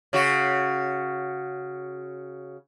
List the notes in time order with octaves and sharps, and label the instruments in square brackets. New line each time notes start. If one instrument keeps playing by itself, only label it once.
[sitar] C#3 F#4